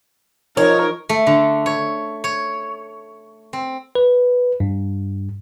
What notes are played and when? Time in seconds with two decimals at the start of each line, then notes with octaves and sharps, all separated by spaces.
0.57 F3 D#4 A#4 C#5
1.09 A3
1.27 D3
1.66 C#5
2.24 C#5
3.53 C4
3.95 B4
4.60 G2